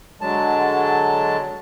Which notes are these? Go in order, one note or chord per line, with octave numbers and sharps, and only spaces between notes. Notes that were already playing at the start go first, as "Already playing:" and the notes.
D3 F#3 G#3 A5